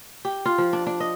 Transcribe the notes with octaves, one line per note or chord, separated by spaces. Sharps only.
G4
F4
F3
D4
D4
D#5